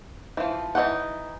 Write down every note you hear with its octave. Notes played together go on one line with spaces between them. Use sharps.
E3 F3
E3 C#4 D#4 F#5